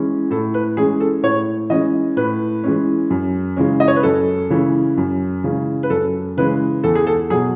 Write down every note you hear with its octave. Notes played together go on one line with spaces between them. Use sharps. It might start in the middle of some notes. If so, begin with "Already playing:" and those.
Already playing: E3 G#3 C#4
A2 A4
B4
E3 G#3 C#4 G#4
A4
A2 C#5
E3 G#3 C#4 D#5
A2 B4
E3 G#3 C#4
F#2
C#3 E3 G#3 C#4
D#5
C#5
B4
F#2 A4
C#3 E3 G#3 C#4
F#2
C#3 E3 G#3 C#4
B4
F#2 A4
C#3 E3 G#3 C#4 B4
E2 A4
G#4
A4
B2 F#3 G#4